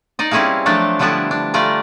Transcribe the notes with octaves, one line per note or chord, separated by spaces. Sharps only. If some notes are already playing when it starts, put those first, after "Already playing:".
D#4 D5 D#5
G3 C4 C#4 E4 G#4 F5
F3 F#3 A3 D4 A4
D3 F3 G3 B3 D4 E4
D4
G3 A3 F4 D5 A#5